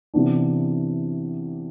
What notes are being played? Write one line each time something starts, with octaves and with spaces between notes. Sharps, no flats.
C3 E3 B3 D4